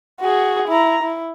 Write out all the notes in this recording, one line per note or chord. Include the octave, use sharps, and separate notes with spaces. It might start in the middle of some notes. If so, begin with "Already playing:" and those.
F#4 G#4
E4 A#5
E4